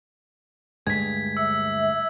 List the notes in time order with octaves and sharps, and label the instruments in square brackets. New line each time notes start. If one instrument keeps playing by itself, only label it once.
[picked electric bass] D2 G2 G#3 [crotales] G#6 B6
[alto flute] E5 [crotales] E6